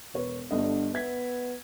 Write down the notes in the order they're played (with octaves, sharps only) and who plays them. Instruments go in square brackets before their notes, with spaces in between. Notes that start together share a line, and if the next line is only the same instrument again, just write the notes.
[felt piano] E1 B4 C#5
[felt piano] G1 G2 D#5 [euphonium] D3
[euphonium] B3 [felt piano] E5 G#6 B6